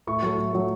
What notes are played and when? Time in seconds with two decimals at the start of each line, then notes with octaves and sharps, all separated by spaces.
0.07 A2 C#6
0.22 F#3 A3
0.37 A2
0.53 F#3 A3